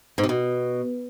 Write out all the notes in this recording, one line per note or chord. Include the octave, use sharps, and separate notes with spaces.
G#2
C3
B2